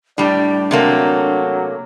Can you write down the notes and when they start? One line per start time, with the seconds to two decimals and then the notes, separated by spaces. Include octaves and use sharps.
0.18 A2 G3 D4 D5
0.71 C3 F#3 A3 A#3